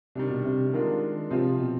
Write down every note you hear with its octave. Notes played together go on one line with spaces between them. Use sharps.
C3 D#3 G3 D4
B2
C3
D3 D#3 G#3 D4 F4
C3 F3 C4 F4
B2